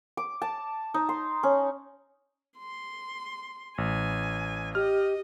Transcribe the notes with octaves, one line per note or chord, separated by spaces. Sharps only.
D6
A5
D#4
C6
C#4
C6
A1 G#5
G4 D#5 F6